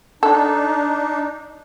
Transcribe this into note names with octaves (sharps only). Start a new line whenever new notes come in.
D4 D#4 A4